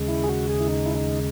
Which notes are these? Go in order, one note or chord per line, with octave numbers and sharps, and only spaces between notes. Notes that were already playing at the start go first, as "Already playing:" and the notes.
Already playing: D#2 C#3 G#3
E4
G#4
F#4
G#4
E4
D#4
E4
D#4